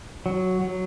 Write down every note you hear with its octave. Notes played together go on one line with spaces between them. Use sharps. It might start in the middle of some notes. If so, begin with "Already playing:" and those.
F#3
F#3